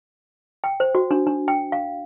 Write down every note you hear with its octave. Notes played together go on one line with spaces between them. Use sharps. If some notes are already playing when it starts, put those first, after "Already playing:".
G5
C5
F#4
D4
D4
G5
F5